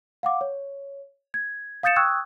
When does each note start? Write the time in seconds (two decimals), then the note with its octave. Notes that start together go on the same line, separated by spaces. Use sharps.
0.23 F5 F#5 D6
0.41 C#5
1.34 G#6
1.83 F5 D#6 G6 A6 C#7 E7
1.96 G5 C#6 D#6 E6 F#6 G#6